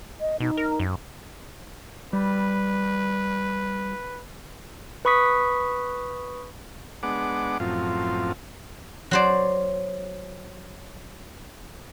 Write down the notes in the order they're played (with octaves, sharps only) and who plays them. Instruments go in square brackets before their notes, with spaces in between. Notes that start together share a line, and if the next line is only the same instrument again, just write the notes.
[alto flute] D#5
[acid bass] B2 [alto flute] D#4
[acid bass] A#4
F#2
[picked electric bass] G3 [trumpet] B4
[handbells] B4 B5 C#6 D#6 B6
[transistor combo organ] G#3 B3 D4 F#5 D6
F#2 A2 F3 C4 F4
[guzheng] F#3 C5 D5